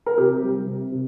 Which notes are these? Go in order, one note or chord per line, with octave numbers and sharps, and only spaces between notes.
A#4
C3 G4
G3
C3
C3